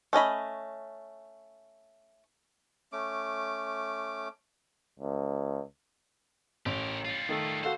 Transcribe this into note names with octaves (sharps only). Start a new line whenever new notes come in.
A3 C#4 D#5 B5
A3 C#4 D6
C#2
A1 G4 A#4
G3 F4
D#3 A3 A4
F#4 A4 C5 F5